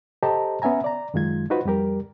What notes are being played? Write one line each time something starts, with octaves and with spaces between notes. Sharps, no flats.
G4 A4 C5 D#5 A5 A#5
B3 C#4 E5 G#5 A#5
D5 A#5
F#2 D#3 G#3 F4 G#6
D#4 F4 F#4 B4 C5
F2 G3 G4 A#4